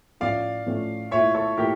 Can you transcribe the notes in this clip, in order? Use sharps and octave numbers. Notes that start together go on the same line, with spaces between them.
A2 F3 A3 C#4 D5 F5
A2 F3 A3 C#4
A#2 A3 E4 C#5 E5
A4 C#5
A#2 A3 E4 G4 A#4